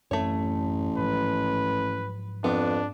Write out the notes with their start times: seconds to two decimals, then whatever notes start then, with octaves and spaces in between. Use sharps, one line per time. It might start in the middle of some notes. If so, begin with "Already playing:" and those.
0.11 A1 F#2 A3 C4 C#5
0.98 G#2 F3 F#3 B4
2.44 F2 B3 D4